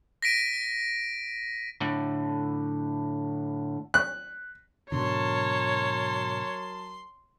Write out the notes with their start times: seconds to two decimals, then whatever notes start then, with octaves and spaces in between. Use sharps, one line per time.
0.22 A#6 B6 D7 D#7
1.81 A2 D3
3.94 F#6
4.92 G#2 B2 D3 F#3 A#4 C#5 A5 C6